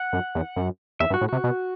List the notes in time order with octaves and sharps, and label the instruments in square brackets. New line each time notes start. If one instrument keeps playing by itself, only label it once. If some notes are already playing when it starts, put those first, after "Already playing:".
Already playing: [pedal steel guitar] F#5
[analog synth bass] F#2
E2
F#2
[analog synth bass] E2 [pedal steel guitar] E5
[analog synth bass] G2
[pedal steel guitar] F#4
[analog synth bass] A2
[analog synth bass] C3 [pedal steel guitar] F#4
[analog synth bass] B2